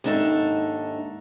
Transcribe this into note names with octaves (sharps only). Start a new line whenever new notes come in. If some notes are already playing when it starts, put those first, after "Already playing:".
D#2 G#2 D4 D#4 A4 E5